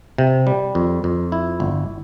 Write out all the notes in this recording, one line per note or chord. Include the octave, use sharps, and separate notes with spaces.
C3
G3
F2
F2
E4
G1